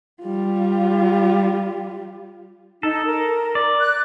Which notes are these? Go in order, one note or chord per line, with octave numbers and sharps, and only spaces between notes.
G3 F4
D#4 A4
A#4
D5
F#6